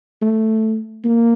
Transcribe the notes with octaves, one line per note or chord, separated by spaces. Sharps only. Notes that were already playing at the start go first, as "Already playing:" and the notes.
A3
A#3